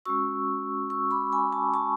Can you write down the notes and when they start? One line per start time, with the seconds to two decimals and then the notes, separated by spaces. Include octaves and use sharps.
0.05 G#3 C#4 F#4 C#6 E6
0.90 C#6 E6
1.11 B5 D6
1.32 G#5 B5
1.53 A5 C#6
1.74 A5 C#6